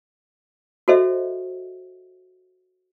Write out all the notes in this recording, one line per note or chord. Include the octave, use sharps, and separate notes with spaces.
F#4 A4 C5 D#5 E5